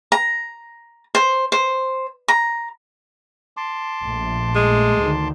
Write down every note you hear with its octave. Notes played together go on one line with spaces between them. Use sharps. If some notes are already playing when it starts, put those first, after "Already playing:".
A#5
C5
C5
A#5
A5 C6 D6
A#1 A3
G#3
D2 D#3